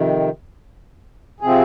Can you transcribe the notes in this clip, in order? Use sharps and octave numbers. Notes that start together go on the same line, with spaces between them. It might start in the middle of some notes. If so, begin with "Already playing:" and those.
Already playing: F2 C3 D#3
C3 F3 C4 G#4